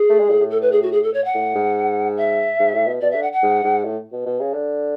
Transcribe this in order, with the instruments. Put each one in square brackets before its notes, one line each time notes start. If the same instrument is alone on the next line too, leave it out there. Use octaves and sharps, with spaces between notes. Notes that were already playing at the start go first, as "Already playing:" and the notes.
Already playing: [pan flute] G#4
[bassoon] A3
G#3
A2
A2
[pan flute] A4
B4
G#4
F#4
G#4
A4
C#5
F#5
[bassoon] A2
G#2
[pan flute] E5
[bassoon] G#2
A2
B2
[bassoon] B2 [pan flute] D5
[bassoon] D3 [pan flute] E5
[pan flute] F#5
F#5
[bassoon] G#2
G#2
A2
B2
B2
C#3
D3